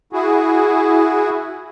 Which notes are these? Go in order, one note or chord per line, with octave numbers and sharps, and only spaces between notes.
E4 F#4 G#4